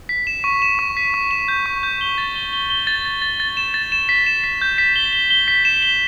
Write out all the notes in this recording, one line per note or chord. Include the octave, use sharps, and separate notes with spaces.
B6
E7
C#6
E7
C#6
B6
C#6
E7
G6
C#6
G6
G7
A6
G7
G7
G7
A6
A6
A6
A6
E7
A6
E7
B6
E7
B6
G6
B6
G7
G7
G7
B6
E7
G7